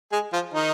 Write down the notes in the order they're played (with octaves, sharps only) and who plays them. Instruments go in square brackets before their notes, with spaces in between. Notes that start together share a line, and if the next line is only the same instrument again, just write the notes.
[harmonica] G#3 G#4
F3 F4
D#3 D#4